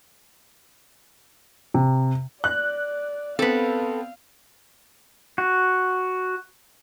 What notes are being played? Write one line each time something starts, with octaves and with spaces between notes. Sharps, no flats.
C3
D5 F#6
B3 C4 A4 B4 F5
F#4